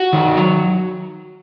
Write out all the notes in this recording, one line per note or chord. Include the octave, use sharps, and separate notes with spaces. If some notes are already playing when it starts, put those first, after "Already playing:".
Already playing: F#4
D#3
F#3